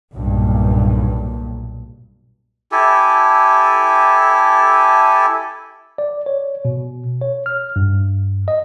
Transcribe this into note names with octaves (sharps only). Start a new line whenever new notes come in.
B1 G2 A#2
E4 G4 A4 G#5
D5
C#5
B2
C#5
F6
G2
D#5